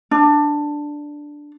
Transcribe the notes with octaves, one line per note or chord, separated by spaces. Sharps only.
D4